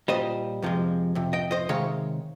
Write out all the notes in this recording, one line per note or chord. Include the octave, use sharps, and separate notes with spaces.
A#2 G3 C5 D#5
F2 C3 F3 G#3
F2 C3
D#5 G5
C5 D#5
C3 D#3 G#3 C#5 F5